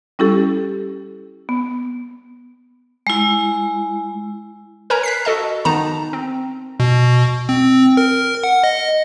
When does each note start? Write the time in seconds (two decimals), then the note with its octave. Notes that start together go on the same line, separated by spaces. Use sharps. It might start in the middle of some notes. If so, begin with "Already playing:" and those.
0.19 G3 C#4 E4 G4 A4
1.49 B3
3.07 G#3 E4
4.90 A#4 B4 C#5 G#5 A#5
5.03 F#6 B6 C7
5.25 F#4 A4 D#5 A5
5.65 D#3 B3 D#4 A5 A#5
6.13 C4
6.80 B2
7.49 C4
7.97 A#4
8.44 F#5
8.64 D#5